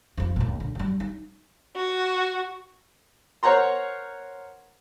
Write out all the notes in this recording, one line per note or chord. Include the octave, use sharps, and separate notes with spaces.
F2 F3
C#2 A#2
D3
F#3 G3
D#4
F#4
A#4 C5 C#5 F#5 A#5 C6